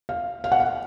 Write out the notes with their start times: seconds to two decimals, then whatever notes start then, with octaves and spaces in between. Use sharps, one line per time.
0.09 F5
0.44 F5
0.52 F#5
0.60 F5